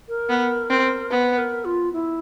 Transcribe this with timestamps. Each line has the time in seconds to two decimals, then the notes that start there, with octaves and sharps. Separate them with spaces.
0.09 A#4
0.29 B3
0.70 C4
1.10 B3 B4
1.38 A#4
1.65 F4
1.93 E4